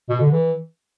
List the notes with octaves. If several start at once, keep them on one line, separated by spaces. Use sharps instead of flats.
B2
D3
E3